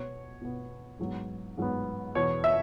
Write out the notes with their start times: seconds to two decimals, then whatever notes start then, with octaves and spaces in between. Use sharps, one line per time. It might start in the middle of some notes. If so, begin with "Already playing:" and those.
Already playing: B2 B3 C#5
0.41 B2 B3
0.99 G#2 F#3 B3
1.58 G#2 F#3 B3
2.15 E2 B2 B3 C#5
2.44 E5